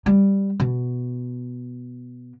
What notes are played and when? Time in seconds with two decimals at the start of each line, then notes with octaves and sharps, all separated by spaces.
0.06 G3
0.60 B2